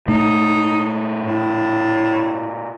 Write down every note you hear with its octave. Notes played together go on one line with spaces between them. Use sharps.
A#2 A3 D#4
A2